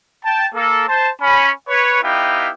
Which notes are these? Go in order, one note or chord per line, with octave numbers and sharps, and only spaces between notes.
G5 A5
A#3 A4
C5 A5
C#4 B5
B4 C#5
B3 D#4 E4 G4 F5 G5